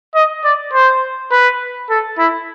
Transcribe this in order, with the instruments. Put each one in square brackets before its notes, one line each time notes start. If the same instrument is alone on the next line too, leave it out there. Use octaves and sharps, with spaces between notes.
[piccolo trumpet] D#5
D5
C5
B4
A4
E4